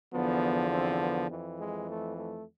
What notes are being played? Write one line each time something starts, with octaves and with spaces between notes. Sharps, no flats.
E2 D3 F3 B3
C4
B3
F2 E3
G#3
A3
A3